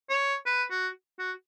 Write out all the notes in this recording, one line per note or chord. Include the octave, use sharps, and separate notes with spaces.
C#5
B4
F#4
F#4